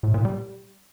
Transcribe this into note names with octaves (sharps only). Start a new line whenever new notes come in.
A2
A#2
G3